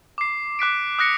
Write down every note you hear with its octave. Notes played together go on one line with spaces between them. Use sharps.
D6 C7
D6 F#6 B6 D7
D#6 F#6 A#6 C#7